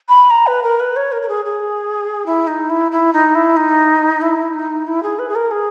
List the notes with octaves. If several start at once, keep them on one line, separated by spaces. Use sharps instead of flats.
B5
A#5
B4
A#4
B4
C#5
A#4
A#4
G#4
G#4
E4
D#4
E4
E4
D#4
E4
D#4
E4
D#4
E4
G#4
B4
G#4
A#4
G#4